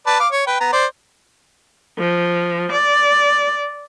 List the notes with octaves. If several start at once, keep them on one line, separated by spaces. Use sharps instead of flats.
B4 D5 A5
F5 D6
C#5
B4 G5
B3 A#5
C5 D5
F3
D5